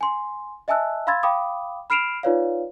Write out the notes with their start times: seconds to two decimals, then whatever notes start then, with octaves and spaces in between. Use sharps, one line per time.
0.01 G#5 C6
0.68 D#5 E5 G#5 A5 E6 F#6
1.07 F5 B5 C6 E6 G#6 A6
1.23 F5 G5 B5 D6 D#6
1.90 B5 F6 C7 D7 E7 F7
2.23 D#4 F4 B4 C#5 D5 F5